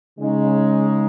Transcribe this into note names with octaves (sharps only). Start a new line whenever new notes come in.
C#3 G#3 D#4